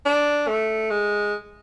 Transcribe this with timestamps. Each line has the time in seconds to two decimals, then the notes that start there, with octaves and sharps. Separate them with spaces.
0.06 D4
0.48 A3
0.90 G#3